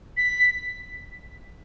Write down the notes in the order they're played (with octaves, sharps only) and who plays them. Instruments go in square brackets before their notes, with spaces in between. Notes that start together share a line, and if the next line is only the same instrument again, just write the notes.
[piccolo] B6